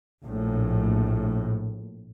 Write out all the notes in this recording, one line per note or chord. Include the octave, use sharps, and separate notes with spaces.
A#1 A2